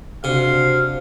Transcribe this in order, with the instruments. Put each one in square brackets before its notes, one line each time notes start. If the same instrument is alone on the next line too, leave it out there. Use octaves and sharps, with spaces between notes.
[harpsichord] C3 [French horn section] D4 F#4 C5 [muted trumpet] F5